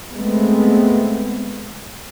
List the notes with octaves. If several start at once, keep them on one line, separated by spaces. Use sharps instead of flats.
G#3 A3 B3 C4